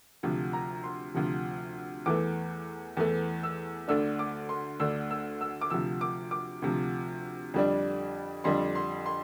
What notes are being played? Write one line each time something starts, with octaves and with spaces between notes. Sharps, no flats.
D2 C3 F3
A#5
C6
D2 C3 F3
E2 E3 A3 D6
E2 E3 A3
E6
D2 D3 A3 D4 E6
D6
C6
D2 D3 A3 D4 E6
E6
E6
D6
D2 C3 F3 E6
D6
D6
D2 C3 F3
F2 D3 G3 D4
F2 D3 G3 D4 C6
C6
C6